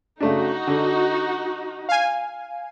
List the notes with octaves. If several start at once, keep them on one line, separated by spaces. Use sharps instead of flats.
C#3 A3 D4 D#4 F#4
D3
F5 G#5